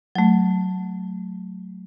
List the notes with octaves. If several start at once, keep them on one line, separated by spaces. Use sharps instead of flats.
F#3 A3